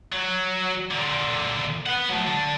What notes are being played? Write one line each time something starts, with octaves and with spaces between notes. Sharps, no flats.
F#3
A#2 D3
B4 F#5
F#3 A3
D4 A4